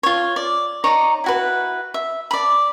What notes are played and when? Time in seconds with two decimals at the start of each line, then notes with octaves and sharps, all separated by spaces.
0.03 F4 C#5
0.36 D5
0.84 D#4 C#5 D5 A#5
1.24 E4 F#4 B4
1.94 E5
2.31 D5 B5